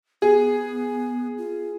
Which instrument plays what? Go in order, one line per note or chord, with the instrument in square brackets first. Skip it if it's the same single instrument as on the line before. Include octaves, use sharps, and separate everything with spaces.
[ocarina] B3 [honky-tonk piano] G#4
[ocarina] F4